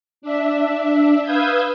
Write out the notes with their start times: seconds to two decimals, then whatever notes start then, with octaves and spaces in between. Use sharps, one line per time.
0.22 D4 E5
1.22 B4 F5 D#6 E6 G6 G#6